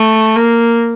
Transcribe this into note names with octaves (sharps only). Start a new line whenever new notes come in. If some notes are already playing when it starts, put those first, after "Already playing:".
Already playing: A3
A#3